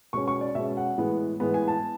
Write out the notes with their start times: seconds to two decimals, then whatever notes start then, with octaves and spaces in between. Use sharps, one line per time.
0.13 B2 G#3 C#4 C#6
0.28 C#6
0.41 D5
0.55 B2 G#3 C#4 E5
0.77 F#5
0.98 A2 E3 G#3 B3
1.40 A2 E3 G#3 B3
1.54 G#5
1.68 A5